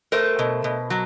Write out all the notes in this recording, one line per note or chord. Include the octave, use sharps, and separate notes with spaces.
A3 A#4 C5
B2
B2
F#3